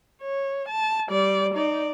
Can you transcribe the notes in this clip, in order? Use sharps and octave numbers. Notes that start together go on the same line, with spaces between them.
C#5
A5
G3 D5
D#4 D5